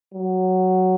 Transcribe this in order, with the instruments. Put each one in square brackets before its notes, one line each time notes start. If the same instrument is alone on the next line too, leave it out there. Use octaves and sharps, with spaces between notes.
[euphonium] F#3